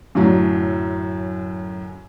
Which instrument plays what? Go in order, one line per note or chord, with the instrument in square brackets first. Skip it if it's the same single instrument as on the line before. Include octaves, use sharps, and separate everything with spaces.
[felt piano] F#2 A2 D3 F#3